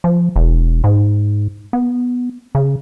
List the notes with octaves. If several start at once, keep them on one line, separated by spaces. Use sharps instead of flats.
F3
E1
G#2
B3
C#3